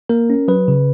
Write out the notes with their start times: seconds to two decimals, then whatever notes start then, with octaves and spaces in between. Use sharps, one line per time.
0.09 A#3 A#4
0.30 C#4
0.48 F#3 B4
0.68 C#3